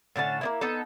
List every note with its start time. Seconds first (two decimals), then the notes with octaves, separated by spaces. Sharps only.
0.16 A2 D3 C#4 A5
0.41 A#3 B3 E4
0.61 B3 D#4 A4